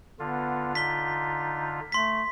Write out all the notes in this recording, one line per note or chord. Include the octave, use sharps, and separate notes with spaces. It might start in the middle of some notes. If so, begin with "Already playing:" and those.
D3 B3 F4
D#4 B6 G7
A3 C6 B6